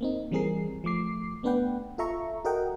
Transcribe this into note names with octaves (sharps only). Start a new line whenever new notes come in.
A#3 C4 D#4
E3 G3 C4 G#4 A#4 C7
F3 A3 D6 C7
A3 B3 D4 B4 F#5 G5
F4 A4 E5 A#5 C#6
F#4 A4 A#4 D#5 F#5 G5